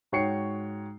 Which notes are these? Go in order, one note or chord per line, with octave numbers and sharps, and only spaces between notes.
G#2 F#4 C#5 G5 C7 C#7